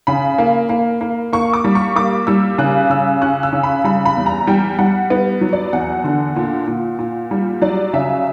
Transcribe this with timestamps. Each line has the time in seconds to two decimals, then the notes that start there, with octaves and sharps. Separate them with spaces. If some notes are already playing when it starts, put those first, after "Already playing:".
0.07 C#3 B5
0.38 A#3
0.69 A#3
1.01 A#3
1.33 A#3 C#6
1.53 D6
1.64 G3
1.75 C#6
1.96 A#3 D6
2.27 G3 E6
2.58 C#3 F#6
2.90 C#3 E6
3.22 C#4 F#6
3.43 E6
3.53 C#3
3.63 B5
3.84 G3 B5
4.06 B5
4.17 E2
4.26 A#5
4.47 G3 G5
4.79 G3 F#5
5.10 B3
5.41 F#3
5.53 D5
5.73 E2 F#5
6.04 D3
6.36 A#2
6.68 A#2
6.99 A#2
7.31 G3
7.62 F#3 D5
7.93 C#3 E5